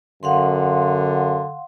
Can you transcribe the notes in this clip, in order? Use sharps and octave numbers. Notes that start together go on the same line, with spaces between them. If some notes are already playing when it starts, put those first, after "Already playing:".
F#2 D3 F5 F#5 C6